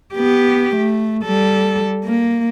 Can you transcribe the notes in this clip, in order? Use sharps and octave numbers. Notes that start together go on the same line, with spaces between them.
B3 G4
A3
G3 A4
A#3